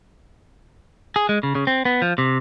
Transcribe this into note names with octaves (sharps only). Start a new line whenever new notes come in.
G#4
G#3
C#3
C#3
C4
B3
F3
C3